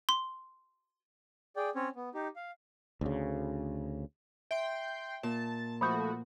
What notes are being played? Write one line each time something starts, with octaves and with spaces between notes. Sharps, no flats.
C6
G#4 D5 G5
C4 C#4 C#5
B3
D#4 G4
F5
D2 C#3
E5 G5 C6
A#2 A5
F3 A3 F#4 B5 D#6 G6